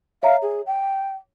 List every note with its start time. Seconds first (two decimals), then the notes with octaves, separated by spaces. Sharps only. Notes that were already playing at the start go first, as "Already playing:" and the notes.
0.23 C#5 E5 F5 A#5
0.42 G#4
0.67 G5